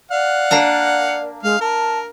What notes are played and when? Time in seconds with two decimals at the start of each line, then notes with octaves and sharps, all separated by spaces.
0.11 D5 F5 F#5
0.51 A#3 D4 A#5
1.43 G#3 F5 F6
1.61 A#4 A5